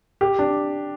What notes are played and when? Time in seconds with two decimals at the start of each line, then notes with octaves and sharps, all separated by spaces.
0.21 G4
0.39 D4